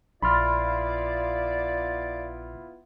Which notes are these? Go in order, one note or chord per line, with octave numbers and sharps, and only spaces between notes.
A#1 B3 E4 F4 D5 B5 C6 F6